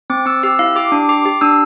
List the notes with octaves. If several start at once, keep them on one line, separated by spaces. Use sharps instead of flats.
C4 D6
C4 E6
G4 E6
E4 F5
G4 D6
D4
G4 D6
G4
D4 E6